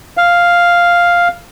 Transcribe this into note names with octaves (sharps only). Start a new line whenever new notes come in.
F5